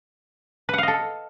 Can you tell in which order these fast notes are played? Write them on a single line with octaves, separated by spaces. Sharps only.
B4 F#5 F5 D#5 A4